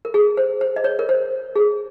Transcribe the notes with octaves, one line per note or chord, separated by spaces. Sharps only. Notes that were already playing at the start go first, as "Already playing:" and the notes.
A#4
G#4
C5
C5
D#5
C#5
A#4
C5
G#4